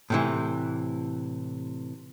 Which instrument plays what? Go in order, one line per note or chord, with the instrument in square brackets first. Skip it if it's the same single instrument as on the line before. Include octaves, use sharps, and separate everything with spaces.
[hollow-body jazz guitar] A2 C3 E3